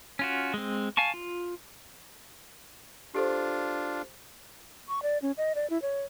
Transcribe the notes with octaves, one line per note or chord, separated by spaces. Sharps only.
C#4 F4 F#4
G#3 C4
F5 G#5 A5 C#6
F4
D4 F4 G4 A4 C5
C#6
D5
C#4
D#5
D5
E4
C#5